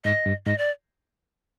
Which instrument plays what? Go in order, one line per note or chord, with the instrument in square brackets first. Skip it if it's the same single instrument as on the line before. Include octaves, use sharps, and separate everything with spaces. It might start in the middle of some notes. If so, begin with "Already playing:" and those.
[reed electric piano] G#2 [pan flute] D#5
[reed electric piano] G2
[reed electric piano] G#2 [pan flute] D#5
[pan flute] D5